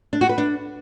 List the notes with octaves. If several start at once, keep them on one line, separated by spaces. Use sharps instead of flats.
D4
F#4
B4
D4